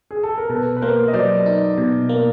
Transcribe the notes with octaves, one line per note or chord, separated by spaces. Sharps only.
G#4
A4
A#4
B2 A4 B4
B4
A#3 A#4 C5
D#5
F#3 C5 D5
D#4
B2
A#3